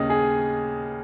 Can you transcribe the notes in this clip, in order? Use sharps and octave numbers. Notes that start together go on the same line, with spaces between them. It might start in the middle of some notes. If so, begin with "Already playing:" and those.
Already playing: D#2 C#3 D#5
G#4